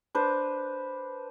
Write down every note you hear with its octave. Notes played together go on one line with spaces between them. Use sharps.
D4 B4 C5